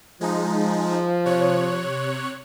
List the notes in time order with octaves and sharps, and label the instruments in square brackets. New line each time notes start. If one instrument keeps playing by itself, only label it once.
[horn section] F3 [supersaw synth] G#3 D#4
[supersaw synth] C3 C#5 F#6